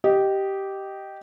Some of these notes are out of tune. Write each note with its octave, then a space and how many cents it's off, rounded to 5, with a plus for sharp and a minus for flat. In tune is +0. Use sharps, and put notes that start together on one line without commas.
G4 -10 D#5 +0